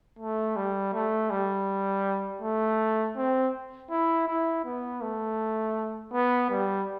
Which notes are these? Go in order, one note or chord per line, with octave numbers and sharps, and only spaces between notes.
A3
G3
A3
G3
A3
C4
E4
E4
B3
A3
B3
G3